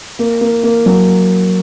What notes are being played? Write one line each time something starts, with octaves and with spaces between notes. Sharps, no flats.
A#3
A#3
A#3
F#3